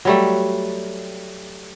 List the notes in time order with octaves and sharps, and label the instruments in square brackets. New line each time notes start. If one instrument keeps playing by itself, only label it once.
[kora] F#3 G3 A3